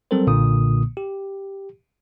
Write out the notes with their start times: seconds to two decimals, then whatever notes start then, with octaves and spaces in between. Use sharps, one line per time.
0.11 F#3 G3 C4 A4 A#4 C5
0.27 B1 A#2 D3 A#3 D#6
0.97 G4